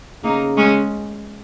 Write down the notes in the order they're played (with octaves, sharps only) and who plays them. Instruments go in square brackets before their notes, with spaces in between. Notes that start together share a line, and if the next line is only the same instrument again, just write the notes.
[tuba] C#3 [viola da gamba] A#3 D#4
[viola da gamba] G#3 C#4